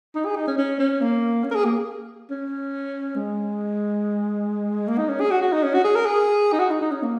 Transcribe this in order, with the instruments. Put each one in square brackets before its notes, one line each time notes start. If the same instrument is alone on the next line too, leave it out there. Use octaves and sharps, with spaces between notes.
[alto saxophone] D#4
G#4
D#4
C#4
C#4
C#4
A#3
C#4
A#4
G#4
A#3
C#4
G#3
A#3
D#4
C#4
G#4
F#4
F#4
D#4
C#4
F#4
G#4
A#4
G#4
D#4
F#4
D#4
D#4
C#4
A#3